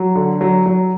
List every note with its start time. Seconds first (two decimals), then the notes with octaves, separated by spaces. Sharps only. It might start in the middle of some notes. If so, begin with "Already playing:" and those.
Already playing: F#3 F#4
0.15 D3
0.41 F#3
0.66 F#3